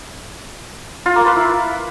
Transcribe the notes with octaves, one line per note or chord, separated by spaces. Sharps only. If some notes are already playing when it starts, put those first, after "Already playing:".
F4
A#3
B4
E4